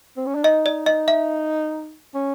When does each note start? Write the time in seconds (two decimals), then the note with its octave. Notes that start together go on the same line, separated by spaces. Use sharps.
0.17 C4
0.26 C#4
0.35 D4
0.44 D#4 D#5
0.66 D5
0.86 D#5
1.08 E5
2.14 C#4